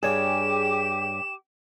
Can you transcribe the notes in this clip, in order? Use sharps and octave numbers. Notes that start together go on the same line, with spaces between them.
G2 G4 G#4 C#5 G5 G#5 D6 E7